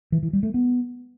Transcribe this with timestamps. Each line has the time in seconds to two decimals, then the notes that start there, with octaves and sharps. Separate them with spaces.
0.12 E3
0.23 E3
0.33 G3
0.43 A3
0.54 B3